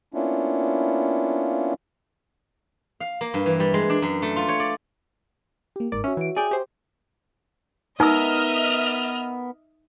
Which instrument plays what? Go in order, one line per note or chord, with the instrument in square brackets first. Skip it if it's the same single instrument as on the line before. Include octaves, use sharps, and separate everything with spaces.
[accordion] A#3 B3 C#4 D4 E4 F4
[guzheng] F5
A#3
G2
E3
G3
G#3
D4
F#2
A3
F4
C#5
D5
[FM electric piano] A#3 G4
[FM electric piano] G1 G#2 A#4 [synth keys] D5
[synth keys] C#4 [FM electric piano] F#4 C#5 E5
[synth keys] E3 D7
[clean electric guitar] G#4 [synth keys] D5 G5
[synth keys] G4 C5
[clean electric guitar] B3 A#4 [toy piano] D#4 E6 [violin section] D#5 E5 F6